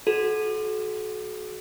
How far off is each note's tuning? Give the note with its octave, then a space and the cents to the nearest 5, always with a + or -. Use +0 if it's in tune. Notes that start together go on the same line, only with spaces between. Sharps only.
F#4 +0 A4 -40